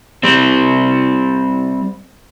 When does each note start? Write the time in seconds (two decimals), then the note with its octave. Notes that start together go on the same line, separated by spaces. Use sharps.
0.23 G3 C4